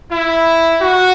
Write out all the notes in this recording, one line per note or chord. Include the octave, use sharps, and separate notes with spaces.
E4
F#4